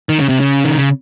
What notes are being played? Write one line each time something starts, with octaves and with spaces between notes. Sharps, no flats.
D#3
C#3
C3
C#3
D#3
C#3